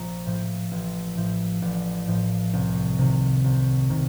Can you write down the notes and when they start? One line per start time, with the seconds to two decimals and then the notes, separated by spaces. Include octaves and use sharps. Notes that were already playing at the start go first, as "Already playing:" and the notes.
Already playing: A#1 F3 A#5
0.26 A2 F3
0.71 A1
1.17 A2 F3
1.62 A1 D5
2.08 A2 F3
2.53 C2
2.98 C3 D#3
3.44 C2
3.89 C3 D#3